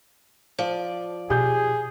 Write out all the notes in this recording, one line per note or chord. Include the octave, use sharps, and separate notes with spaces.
F3 D5
B2 G4 G#4 G6